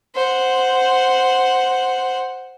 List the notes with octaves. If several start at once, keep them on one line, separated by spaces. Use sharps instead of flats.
C5 F#5